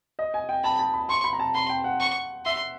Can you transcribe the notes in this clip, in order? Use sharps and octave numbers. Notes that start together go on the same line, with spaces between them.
D#5
G#5
G5
A5 B5
A5
B5
C6 C#6
B5
A#5
A5
B5 C6
G5
F#5
C#6
E5 C6